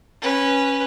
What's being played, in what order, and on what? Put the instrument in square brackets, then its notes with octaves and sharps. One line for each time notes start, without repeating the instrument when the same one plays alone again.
[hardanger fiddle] C#4 B4